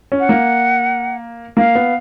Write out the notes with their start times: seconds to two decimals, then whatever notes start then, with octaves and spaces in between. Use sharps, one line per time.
0.12 C#4
0.20 F#5
0.29 A#3
1.57 A#3 F5
1.75 B3